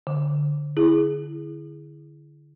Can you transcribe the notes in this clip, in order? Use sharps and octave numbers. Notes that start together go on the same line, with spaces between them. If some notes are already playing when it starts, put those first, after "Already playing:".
D3
E4 G#4